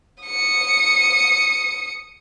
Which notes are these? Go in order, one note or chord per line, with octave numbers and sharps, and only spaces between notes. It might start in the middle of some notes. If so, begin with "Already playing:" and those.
D#6 C#7